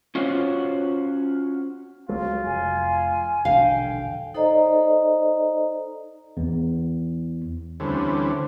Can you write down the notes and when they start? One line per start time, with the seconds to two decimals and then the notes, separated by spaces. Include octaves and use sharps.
0.15 C#4 F4 F#4 C5 C#5
2.09 C#2 F#3 G#3 F4
2.45 F1 G#5
3.45 E1 A#1 D3 F5 G5
4.34 D#4 A4 C5 D5 D#5 A#5
6.37 E2
7.80 D2 D3 E3 G3 C4 C#4